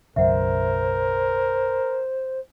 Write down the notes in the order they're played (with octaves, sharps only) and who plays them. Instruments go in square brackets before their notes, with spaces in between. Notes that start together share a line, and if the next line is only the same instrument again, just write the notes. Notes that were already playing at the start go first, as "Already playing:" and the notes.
[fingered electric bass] B1 F#2 C#3 [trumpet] A#4 [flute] C5 [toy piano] E5 F#5